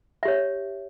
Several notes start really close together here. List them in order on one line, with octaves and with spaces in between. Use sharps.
E5 G4 C#5